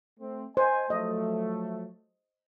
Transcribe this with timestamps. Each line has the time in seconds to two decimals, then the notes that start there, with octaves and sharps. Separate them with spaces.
0.20 A3 C4
0.57 C5 D#5 G#5
0.90 F3 F#3 A3 D#5